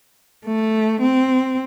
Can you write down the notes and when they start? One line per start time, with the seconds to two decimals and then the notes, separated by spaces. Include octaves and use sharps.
0.46 A3
1.01 C4